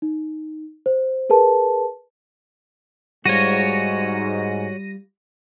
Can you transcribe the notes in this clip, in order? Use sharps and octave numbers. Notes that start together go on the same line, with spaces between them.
D#4
C5
G#4 A#4 B4 A5
G#2 G3 F4 F#4 C#5 A#6 D#7